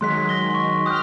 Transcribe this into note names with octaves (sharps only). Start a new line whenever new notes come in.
D#3 F#3 G#3 C6 F#6 B6
A#6 G7
C6 C#6
G5 D#6 F6 F#6